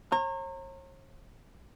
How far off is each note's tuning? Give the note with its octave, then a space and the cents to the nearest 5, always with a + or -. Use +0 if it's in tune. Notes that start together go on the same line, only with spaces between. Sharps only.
C#5 -45 A#5 -25